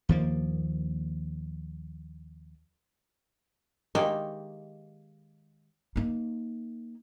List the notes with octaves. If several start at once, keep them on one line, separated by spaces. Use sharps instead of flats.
D#2 F3 A#3
D#3 G#3 A#3 G4 D5 G5
A#3 D#4